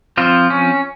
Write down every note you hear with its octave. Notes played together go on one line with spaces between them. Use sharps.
F3 C4 F4
C#4